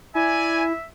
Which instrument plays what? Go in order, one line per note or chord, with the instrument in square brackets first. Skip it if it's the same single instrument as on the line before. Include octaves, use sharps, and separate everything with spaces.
[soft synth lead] E4 [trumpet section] D5 G#5 [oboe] E5